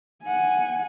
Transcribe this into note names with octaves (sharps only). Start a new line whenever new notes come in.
F#5 G#5